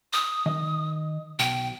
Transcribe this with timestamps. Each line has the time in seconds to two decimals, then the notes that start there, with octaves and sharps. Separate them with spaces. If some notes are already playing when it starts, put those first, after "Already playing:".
0.13 D#6
0.46 D#3 D#5
1.39 B1 G5